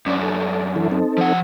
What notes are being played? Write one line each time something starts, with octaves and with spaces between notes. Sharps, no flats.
F#2 C#4 D4 D5
A4
E3 E4 A4
C4 D#4 A4
F3 F#5